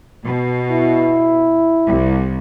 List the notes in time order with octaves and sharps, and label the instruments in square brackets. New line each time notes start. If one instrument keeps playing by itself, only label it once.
[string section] B2
[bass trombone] E4
[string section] C2